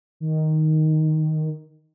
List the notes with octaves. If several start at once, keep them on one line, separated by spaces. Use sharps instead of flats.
D#3